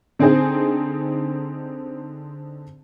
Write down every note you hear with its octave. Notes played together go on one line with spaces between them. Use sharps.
D3 C4 D#4 G#4 C5